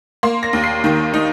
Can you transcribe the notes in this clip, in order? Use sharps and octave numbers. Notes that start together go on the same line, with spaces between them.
A#3 C6
A#6
D#2
C7
D#3
D#4